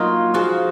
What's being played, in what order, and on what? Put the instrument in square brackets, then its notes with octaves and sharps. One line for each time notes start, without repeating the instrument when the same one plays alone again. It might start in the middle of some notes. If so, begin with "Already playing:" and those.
Already playing: [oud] F#3 A#3 [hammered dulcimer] D#4 F4
[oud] F3 G#3 [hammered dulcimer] F#4